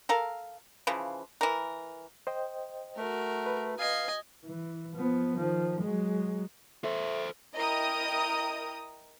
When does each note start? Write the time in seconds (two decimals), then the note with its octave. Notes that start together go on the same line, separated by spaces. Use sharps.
0.09 A4 A#4 F5
0.87 C#3 E3 F3
1.41 E3 A#4
2.27 C5 D#5 G5
2.97 A3 F#4 A#4
3.46 B4
3.79 D#5 F5 G#5
4.45 E3
4.96 F3 B3
5.37 D#3 F3
5.81 F#3 G#3
6.84 A3 A4 C5
7.55 E4 A#4 D#5 G5 A#5 D#6